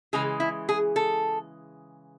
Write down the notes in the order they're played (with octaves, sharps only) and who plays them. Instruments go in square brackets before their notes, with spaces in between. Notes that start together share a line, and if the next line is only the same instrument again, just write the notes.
[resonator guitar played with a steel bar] C#3 E3 G#3 G#4
E4
G#4
A4